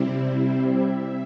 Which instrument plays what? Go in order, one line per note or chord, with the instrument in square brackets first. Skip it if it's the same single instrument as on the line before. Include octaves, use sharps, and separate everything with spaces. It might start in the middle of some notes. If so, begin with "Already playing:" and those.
Already playing: [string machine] C3 G3 C4 E4
C5
E5